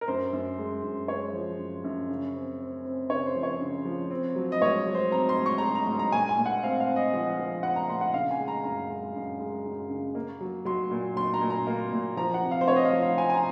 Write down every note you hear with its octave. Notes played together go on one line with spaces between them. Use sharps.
A#4
F#2 C5
F#2
G#3
F#2
G#3 C#5
F3
F#2
F#2
C#3
C4
C4
C4
C#3 C#5
C5
F3
C#5
C#3
F3
C4
F#3
D#5
G#2 C#5
F#3
C5
C4 A#5
C6
G#2
C#6
A#5
F#3 C6
A#5
G#2
A#5
A#2 G#5
G#5
A#2
F#5
C4 F5
F5
C4
D#5
F3 D#5
F3
C4 F#5
A#5
A#2 C6
F#5
C#3 F5
G#5
G#3
A#5
F#2 A#5
G#3
F#2
G#3
F#2
C#3
A#3
F#3
F#3 C6
A#2
F#3 C6
A#5
A#2
A#5
A#3
A#2
F3 A#5
F#5
C3
F5
C5
C4 C#5
D#5
F5
F3
F5
C4 G#5
G#5
A#5